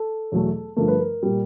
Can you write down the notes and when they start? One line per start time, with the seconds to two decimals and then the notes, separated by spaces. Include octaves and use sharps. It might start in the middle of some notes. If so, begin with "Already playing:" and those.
Already playing: A4
0.32 E2 B2 F#3 A3
0.76 G2 D3 F3 A3 A#4
0.88 B4
1.00 A#4
1.23 A#2 G3